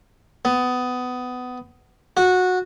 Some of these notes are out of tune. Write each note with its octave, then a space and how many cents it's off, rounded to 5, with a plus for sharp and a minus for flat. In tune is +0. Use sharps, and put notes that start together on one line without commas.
B3 +20
F#4 -15